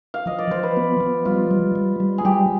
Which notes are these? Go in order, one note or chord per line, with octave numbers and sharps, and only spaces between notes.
F5
F3 D#5
D5
F3 C5
B4
B3
F3
G3 F4
G3
G3
G3
G#4
G3 G4